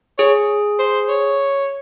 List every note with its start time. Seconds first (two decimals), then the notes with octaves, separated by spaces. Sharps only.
0.18 G#4 C#5
0.79 C5
1.09 C#5